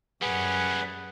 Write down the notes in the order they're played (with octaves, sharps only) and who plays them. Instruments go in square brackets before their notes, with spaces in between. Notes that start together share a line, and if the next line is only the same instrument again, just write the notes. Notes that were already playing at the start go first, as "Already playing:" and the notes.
[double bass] F#2 [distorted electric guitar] G3 C#4 [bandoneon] G#4 B4 F#5